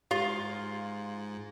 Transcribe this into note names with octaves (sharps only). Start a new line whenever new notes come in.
G#2 F4 G4 F5